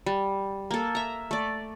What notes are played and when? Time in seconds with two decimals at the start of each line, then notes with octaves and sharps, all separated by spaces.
0.06 G3
0.71 A#3 A4
0.95 E5 A#5
1.31 A3 D5